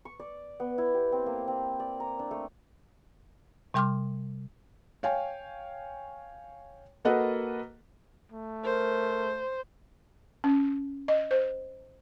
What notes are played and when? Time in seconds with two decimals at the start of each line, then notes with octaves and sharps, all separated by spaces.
0.05 C#6
0.20 D5
0.60 B3
0.78 E4
0.94 G4
1.12 C4
1.26 A#3
1.48 C4
1.80 D5
2.00 A#5
2.19 D4
2.31 A3
3.74 C3 G3 G5 C6 D6 F6
5.03 C#5 F5 G5 G#5
7.05 A#3 F#4 A4 B4 D#5 F#5
8.32 A3
8.65 A#4 C5
10.44 C#4
11.08 D#5
11.31 C5